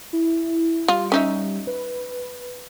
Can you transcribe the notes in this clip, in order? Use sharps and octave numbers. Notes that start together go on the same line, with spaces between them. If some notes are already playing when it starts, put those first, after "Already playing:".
E4
G3 F4
C#4 D#4 E5
B4